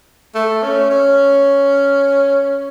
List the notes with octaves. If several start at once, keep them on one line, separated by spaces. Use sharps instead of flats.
A3
C#4
C#4